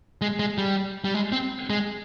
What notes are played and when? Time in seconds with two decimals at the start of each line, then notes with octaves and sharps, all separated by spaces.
0.21 G#3
0.39 G#3
0.58 G3
1.05 G3
1.14 G#3
1.32 C4
1.70 G#3